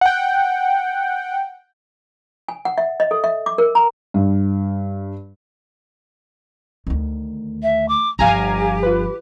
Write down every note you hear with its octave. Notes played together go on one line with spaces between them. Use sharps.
F#5 G5
G#5
F#5
E5
D#5
A4
E5
D6
A#4
A#5
G2
D2 D#3
E5
D6
G1 F3 G4 F5 G#5 A#5
F4 B4